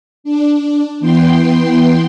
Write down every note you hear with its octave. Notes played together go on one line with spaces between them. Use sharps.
D4
E3 B3 G5 C6